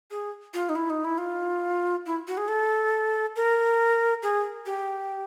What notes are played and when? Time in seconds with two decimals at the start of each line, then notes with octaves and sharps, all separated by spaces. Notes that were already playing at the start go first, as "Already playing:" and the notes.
0.11 G#4
0.54 F4
0.69 D#4
0.76 E4
0.90 D#4
1.04 E4
1.18 F4
2.06 E4
2.28 F#4
2.37 G#4
2.48 A4
3.36 A#4
4.23 G#4
4.66 G4